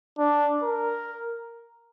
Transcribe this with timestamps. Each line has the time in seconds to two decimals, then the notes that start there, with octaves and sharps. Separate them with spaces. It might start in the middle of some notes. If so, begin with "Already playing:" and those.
0.19 D4
0.63 A#4